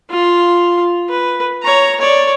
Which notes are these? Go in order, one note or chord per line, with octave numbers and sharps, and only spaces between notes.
F4
B4
C#5 A#5
C#5 D5